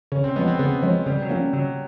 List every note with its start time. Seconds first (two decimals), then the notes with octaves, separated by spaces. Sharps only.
0.12 C#3 C#4
0.24 C4
0.36 F3 G#3 B3
0.48 C4
0.59 C#3 B3
0.83 F3 G#3 C#4
1.07 C#3 G3
1.22 F#3
1.30 F3 A#3 C#4
1.53 C#3 F#3